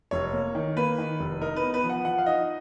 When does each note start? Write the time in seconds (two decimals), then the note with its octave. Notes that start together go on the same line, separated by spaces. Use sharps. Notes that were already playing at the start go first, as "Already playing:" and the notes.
0.11 F1 C#5
0.33 A#3
0.55 D#3
0.77 A#3 B4
0.98 D#3
1.20 F1
1.41 D#4 A#4
1.56 B4
1.62 B3
1.74 B4
1.84 F3
1.89 F#5
2.05 F3 F#5
2.18 F5
2.26 D#4 D#5